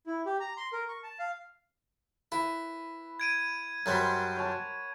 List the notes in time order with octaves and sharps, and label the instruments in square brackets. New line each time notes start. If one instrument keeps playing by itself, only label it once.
[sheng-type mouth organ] E4
G4
A#5
C6
A#4
C#6
A5
F5
[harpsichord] E4 [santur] B4
[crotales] G#6 D7 D#7
[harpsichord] F#2 F#3 G3 [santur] A#4 C5 B5
[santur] C#5 F#5 A5